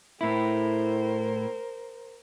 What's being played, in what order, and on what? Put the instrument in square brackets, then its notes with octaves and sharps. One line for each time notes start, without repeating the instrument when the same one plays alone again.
[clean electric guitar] A2 E4 [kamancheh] A#4 C5